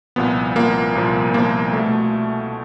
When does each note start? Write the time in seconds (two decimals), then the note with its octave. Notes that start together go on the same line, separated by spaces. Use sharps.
0.16 C2 A#2 F3 B3
0.56 C2 A#2 F3 A#3
0.95 C2 A#2 F3
1.34 C2 A#2 F3 A#3
1.73 B2 A3